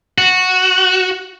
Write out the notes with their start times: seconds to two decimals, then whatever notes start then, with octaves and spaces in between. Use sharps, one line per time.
0.18 F#4